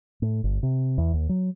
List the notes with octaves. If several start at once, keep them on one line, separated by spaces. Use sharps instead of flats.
A2
G1
C3
E2
D#2
F#3